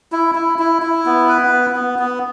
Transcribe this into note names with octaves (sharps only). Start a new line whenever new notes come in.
E4
E4
E4
E4
B3
B4
B3
B3
B3